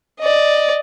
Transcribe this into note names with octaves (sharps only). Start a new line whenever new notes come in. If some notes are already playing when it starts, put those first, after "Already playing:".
D5 D#5